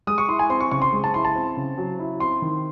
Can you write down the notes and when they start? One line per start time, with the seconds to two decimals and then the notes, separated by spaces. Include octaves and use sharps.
0.07 G#3 D#6
0.18 C#6
0.28 E4 C6
0.39 G#5
0.50 C4 C6
0.61 C#6
0.71 C#3 C#6
0.82 C6
0.93 G#3
1.04 A5
1.14 E4 C6
1.25 A5
1.36 C4
1.57 C#3
1.78 F#3
1.99 E4
2.20 C4 C6
2.42 D#3